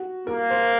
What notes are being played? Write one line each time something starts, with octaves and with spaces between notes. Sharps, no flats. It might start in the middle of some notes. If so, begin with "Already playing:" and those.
Already playing: F#4
A#3 A#4
C5